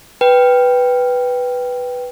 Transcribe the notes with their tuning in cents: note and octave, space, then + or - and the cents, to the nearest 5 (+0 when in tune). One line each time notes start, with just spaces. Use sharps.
B4 +0 G5 +0